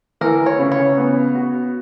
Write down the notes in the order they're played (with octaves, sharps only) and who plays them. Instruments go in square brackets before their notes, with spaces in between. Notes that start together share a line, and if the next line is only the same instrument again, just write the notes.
[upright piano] E3 [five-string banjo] A#4
[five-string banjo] C#5
[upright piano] C#3
[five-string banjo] C#5
[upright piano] B3
F#4